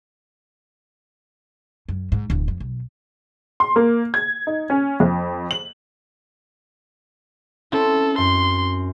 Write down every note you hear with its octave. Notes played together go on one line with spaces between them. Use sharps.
F#2
G#2
D1 E2
F2
B1
C6
A#3
G#6
D#4
C#4
F2
F#7
C4 C#4 E4 A4
F#2 C6